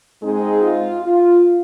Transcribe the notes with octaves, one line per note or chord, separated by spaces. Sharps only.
G#2 G#3 C4 D#4 G#4
F4
F4